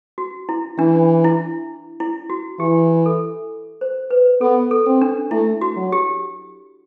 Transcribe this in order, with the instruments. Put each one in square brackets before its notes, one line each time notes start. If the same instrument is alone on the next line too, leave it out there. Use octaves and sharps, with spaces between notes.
[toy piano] F#4
E4
[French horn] E3 [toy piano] D4
[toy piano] E4
E4
F#4
[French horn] E3 [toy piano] G4
[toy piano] A4
C5
B4
[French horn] B3 [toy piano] A4
[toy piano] A4
[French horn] C4
[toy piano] D4
[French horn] A3 [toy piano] E4
[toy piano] F#4
[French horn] F#3
[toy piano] G4